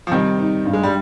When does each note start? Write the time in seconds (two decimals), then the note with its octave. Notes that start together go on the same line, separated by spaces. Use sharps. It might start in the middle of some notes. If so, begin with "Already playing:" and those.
0.07 F3
0.11 C3 D#3 G3
0.39 D#4
0.65 G2
0.73 G#3
0.83 G3